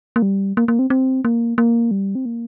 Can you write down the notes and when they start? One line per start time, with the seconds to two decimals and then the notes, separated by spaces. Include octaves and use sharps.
0.16 A#3
0.22 G3
0.57 A#3
0.68 A#3
0.79 C4
0.90 C4
1.25 A#3
1.58 A#3
1.91 G3
2.15 C4
2.25 A#3